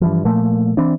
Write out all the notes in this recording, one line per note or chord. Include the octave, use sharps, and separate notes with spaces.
G2 E3 F3
A#2 F3 A3 A#3
E3 C4 D4